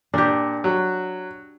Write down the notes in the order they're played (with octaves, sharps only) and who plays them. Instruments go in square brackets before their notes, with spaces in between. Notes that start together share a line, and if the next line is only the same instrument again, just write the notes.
[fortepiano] A#2 [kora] D4 G4
[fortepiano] F#3